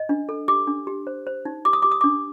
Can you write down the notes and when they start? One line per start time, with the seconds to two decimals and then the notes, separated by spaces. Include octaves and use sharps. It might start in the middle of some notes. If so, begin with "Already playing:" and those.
Already playing: D#5
0.09 D4
0.29 A4
0.48 G4 D6
0.67 D4
0.87 G4
1.07 C5
1.27 C5
1.45 D#4
1.65 G4 D6
1.73 D#6
1.82 G4 D6
1.92 D#6
2.01 D4 D6